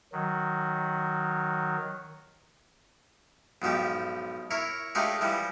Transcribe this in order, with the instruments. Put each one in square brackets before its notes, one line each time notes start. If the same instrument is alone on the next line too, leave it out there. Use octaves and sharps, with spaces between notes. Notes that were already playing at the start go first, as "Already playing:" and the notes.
[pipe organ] D#3 F#3
[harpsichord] B1 G#2 F3 G4
E4 A#4 C#5
G#3 A3 D4 F4 G4 A#4
E3 F3 G3